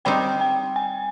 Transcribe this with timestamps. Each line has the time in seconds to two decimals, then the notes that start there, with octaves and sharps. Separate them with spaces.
0.05 G3 C4 D#4 G5
0.41 G5
0.76 G#5